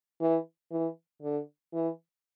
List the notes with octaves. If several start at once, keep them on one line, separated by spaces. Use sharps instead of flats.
E3
E3
D3
E3